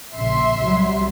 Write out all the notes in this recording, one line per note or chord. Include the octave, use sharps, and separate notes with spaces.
A#1 C#3 E5 C6
C2 F#3 G3